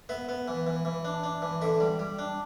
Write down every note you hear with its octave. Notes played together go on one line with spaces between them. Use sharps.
B3 E5
B3
E3
E3
E3
D4
D4
E3
D3 E5
G3
G3
D4